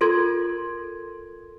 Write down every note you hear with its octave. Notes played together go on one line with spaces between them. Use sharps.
F4 A4 A#4 C6 G#6